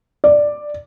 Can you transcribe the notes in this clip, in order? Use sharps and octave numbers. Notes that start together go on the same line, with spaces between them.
D5